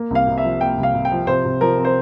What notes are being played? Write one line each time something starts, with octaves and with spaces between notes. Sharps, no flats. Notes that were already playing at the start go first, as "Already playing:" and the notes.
Already playing: A#3
C2 F5
C3
E5
F3
A#3 G5
C2
F5
C3
G5
F3
C3 C5
C3
F3 A#4
C4
C5